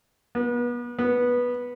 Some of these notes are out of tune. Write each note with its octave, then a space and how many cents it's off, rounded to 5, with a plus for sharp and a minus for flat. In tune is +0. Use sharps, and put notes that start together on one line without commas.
B3 -35
B3 -10